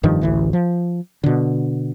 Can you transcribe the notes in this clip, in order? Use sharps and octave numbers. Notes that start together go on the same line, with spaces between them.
F1 G2 D#3 F3
A1 D2 E3
F3
B2 D3